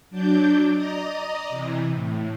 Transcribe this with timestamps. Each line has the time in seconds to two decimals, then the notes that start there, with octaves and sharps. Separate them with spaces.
0.10 F#3 D4 D5 G6
0.71 D5 D#5 A#5 D#6
1.49 C3 E3
1.94 A2